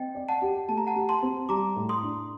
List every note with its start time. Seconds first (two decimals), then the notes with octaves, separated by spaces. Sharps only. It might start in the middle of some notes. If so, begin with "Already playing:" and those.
Already playing: C4 D#5 G5
0.15 D5
0.29 F#5 A5
0.42 G4
0.69 A3 A5
0.78 A#5
0.87 F#5 A5
0.96 G4
1.09 A5 C6
1.23 C4
1.49 G3 A#5 D6
1.76 A2
1.89 C6 D#6
2.03 D4